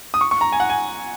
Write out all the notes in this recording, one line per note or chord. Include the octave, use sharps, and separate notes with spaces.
D#6
C#6
C#6
A#5
G#5
F#5
G#5